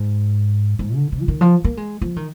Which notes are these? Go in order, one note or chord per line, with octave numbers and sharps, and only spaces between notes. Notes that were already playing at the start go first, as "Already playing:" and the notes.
Already playing: G#2
G#2
D3
B2
F3
D#3
F3
A#3
G#3
F3
D#3